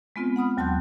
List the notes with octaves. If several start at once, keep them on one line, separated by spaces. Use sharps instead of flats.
G#3 B3 C4 F4
F#5 B5 D#6 F6
D#2 F#3 A5 C6 F#6 G6